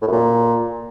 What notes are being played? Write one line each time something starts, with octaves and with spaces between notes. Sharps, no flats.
A2
F#2
A#2